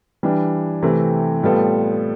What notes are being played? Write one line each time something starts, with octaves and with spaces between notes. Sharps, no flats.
E3 G3 D4
C3 E3 A3 C4
A2 G3 B3 F4 A4